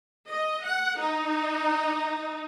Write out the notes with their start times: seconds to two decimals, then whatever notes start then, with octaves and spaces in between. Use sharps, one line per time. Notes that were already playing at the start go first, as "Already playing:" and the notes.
0.30 D#5
0.65 F#5
0.98 D#4